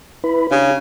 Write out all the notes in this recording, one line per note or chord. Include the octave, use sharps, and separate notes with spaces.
E4 B4 B5
C#3 D4 G4